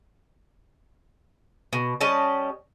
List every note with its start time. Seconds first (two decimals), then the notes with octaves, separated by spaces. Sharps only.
1.73 B2
2.01 G3 C#4 D#5 A5